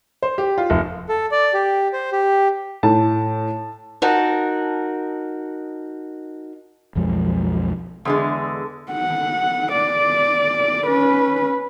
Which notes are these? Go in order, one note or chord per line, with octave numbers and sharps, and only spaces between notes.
C5
G4
F4
F1
A4
D5
G4
C5
G4
A2 A5
D#4 F#4 A#4 A5
B1 F2 F3 G#3
E2 D3 G#3
F#5
D5
C#4 B4